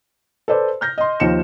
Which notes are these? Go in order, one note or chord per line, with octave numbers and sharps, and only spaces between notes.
A4 B4 C5 D5
F6 G6 A#6
D#5 C6
D#2 F3 D#4 C#7 E7